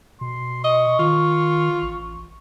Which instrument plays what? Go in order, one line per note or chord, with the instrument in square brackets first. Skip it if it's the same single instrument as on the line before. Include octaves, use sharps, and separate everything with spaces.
[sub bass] B2 [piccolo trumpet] C6
[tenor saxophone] D#5 [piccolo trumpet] C#6
[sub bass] D#3 [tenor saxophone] F4
[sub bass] A1